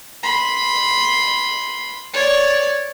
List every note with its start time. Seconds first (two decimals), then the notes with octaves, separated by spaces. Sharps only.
0.23 B5 C6
2.14 C#5 D5